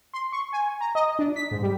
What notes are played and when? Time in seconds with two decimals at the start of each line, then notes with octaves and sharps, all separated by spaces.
0.14 C6
0.32 C#6
0.53 G#5
0.81 A#5
0.95 D#5
1.19 D4
1.36 B6
1.51 G#2
1.62 G3